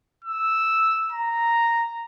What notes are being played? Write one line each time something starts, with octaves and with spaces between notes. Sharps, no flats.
E6
A#5